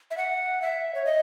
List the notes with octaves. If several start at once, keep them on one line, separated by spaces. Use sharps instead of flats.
E5
F#5
E5
C#5
D#5